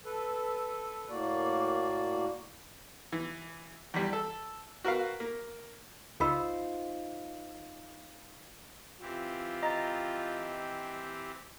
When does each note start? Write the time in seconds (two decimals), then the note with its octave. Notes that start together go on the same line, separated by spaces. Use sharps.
0.05 A4 B4
1.09 A2 A#3 F#4 D5
3.12 E3
3.94 E2 G3
4.13 A4
4.84 F#4 A#4 B4 F5
5.20 A#3
6.20 C#2 D#4 F4 C5 B5 E6
9.01 E3 C4 F4 G4
9.63 D#5 A#5 A6